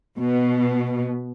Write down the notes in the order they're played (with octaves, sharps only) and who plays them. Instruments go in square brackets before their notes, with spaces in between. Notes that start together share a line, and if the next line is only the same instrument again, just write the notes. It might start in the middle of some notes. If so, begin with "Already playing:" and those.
[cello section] B2